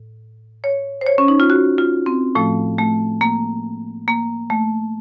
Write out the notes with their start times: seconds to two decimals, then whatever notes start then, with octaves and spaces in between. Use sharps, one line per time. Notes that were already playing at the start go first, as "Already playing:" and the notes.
Already playing: A2
0.64 C#5
1.01 C5
1.07 C#5
1.18 C#4
1.28 D#4
1.40 F4
1.50 F#4
1.78 F4
2.06 C4
2.35 A2 F3 A3
2.79 A3
3.21 A#3
4.08 A#3
4.50 A3